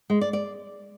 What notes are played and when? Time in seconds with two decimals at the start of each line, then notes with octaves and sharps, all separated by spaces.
0.10 G#3
0.21 D5
0.33 D5